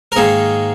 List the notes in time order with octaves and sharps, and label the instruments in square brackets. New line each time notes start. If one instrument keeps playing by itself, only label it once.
[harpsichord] A#4
G#2 D#3 A#3 G#4